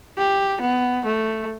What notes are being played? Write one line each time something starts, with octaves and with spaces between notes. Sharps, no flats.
G4
B3
A3